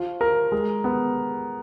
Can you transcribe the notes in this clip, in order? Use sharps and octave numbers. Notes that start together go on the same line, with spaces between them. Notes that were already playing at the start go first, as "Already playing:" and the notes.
Already playing: F3 F4
A#4
G#3
B3